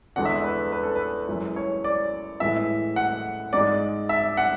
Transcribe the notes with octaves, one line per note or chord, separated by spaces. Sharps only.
E2 D3 G#3 F#5
E5
B4
B4
A4
B4
F#2 E3 G#3
C#5
D5
A2 E3 G#3 E5
F#5
G#2 G#3 D5
E5
F#5